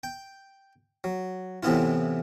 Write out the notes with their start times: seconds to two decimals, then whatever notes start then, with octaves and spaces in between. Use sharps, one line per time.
0.03 G5
1.04 F#3
1.63 A2 C3 E3 B3 E4 F4